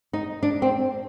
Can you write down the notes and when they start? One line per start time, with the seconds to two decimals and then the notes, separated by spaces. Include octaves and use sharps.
0.13 D#4
0.43 D4
0.62 C4